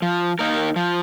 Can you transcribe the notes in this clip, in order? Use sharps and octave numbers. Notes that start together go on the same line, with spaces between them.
F3
A#3 D#4 A#4
F3